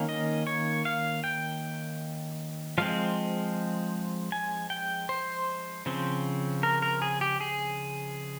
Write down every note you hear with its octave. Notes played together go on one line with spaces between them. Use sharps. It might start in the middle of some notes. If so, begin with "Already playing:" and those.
Already playing: D#3 A#3 C#4
D#5
C#5
F5
G5
F3 G#3 C4 F5
G#5
G5
C5
C#3 F3 C4
A#4
A#4
G#4
G4
G#4